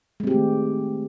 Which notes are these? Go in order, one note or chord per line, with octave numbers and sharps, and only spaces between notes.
D#3 G#3 A3 C4 G4